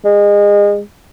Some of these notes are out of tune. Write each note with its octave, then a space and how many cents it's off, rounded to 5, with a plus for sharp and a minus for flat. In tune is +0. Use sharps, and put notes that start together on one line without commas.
G#3 -30